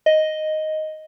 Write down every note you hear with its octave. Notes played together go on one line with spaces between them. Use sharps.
D#5